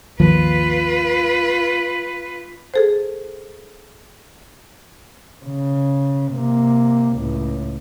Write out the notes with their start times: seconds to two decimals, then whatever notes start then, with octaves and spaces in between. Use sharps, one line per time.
0.20 G#1 D#2 F3 F4 B4
2.74 G#4 A4 C5
5.45 C#3
6.32 C3 A#3
7.15 C#2 A2